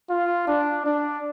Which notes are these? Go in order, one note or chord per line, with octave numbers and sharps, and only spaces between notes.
F4
D4
D4